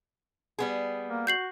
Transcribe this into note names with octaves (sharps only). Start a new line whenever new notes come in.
G3 B3 G#4
A#3
F#4 G6 C7 F#7